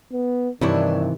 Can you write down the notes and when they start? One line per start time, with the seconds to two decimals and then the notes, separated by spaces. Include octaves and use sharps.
0.12 B3
0.61 G2 C3 D#3 E3 D4 E4 C#5